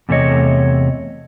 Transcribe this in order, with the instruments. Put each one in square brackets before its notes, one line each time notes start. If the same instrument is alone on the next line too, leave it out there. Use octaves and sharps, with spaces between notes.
[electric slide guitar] E2 C3 A3 A#3 C#5 D#5